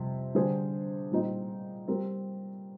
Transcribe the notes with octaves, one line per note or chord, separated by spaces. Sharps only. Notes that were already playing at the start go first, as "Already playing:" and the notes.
Already playing: F2 C3 G3
D3 G3 D4 G#4 C5
A#2 G3 C4 D#4
G3 C4 G4 A#4